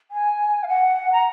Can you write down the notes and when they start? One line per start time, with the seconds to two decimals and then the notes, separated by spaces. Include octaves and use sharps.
0.11 G#5
0.63 F5
0.68 F#5
1.12 A#5